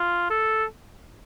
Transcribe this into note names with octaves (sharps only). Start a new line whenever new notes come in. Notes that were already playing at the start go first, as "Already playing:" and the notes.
Already playing: F4
A4